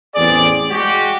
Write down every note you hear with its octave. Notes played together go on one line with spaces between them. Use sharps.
A1 E2 C4 G#4 D5
G#3 F#4 G4